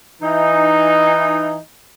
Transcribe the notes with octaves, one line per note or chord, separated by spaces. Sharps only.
E3 D#4